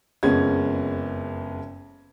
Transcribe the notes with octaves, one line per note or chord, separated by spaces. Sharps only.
F#1 F2 G#3 B3 C#4 G#6